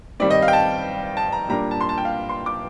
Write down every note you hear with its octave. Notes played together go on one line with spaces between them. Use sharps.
G2 D#3 G3 C4 D5
D#5
F5
G5
A5
A5
A#5
A#2 G3 A#3 D4 A#5
A5
C6
A5
G5
F5
C6
D6